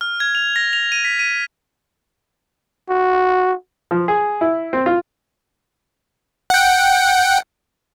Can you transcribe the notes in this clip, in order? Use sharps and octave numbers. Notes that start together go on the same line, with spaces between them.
F6
G#6
F7
A#6
F7
D#7
B6
D#7
F#4
F3
G#4
E4
C4
F4
F#5 G5